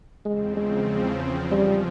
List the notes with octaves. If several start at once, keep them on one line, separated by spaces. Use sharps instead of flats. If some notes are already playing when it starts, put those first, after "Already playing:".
E2 C#3 F3 G#3 C4
G#3
C3 F3 G3 G#3 C#4